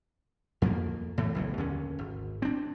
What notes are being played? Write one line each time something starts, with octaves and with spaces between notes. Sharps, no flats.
F2 F3 A3 A#3
A2 E3 A3
F#1 B1 A2
D#2 D3 C#4
G#1
C4 D4